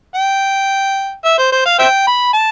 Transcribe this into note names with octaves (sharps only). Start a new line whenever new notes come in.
G5
E5
C5
C5
F5
C5 E5 G5
B5
A5